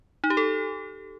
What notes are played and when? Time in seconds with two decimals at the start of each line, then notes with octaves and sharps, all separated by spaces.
0.24 D#4
0.30 G4
0.37 A4